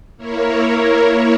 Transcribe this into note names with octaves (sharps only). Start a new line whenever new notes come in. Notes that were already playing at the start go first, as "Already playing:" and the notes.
A#3 E4 A#4 C#5